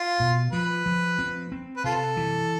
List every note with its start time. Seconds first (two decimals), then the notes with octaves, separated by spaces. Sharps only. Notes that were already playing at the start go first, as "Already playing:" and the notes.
Already playing: F4
0.20 B2
0.52 F3 B4
0.86 F3
1.19 C4
1.52 C4
1.77 B4
1.84 C3 F4 A4
2.17 E3